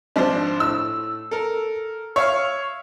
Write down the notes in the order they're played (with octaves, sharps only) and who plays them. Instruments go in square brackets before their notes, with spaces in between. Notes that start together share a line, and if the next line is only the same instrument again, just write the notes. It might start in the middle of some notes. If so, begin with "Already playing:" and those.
[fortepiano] G#1 F3 [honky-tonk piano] D4 C5
[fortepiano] A2 [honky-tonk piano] E6
[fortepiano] A4 A#4
[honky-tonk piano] C#5 [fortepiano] E5 F5